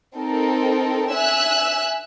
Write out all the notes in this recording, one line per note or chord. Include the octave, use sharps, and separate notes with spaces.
C4 D#4 A4 A#4
E5 G#5 E6 F#6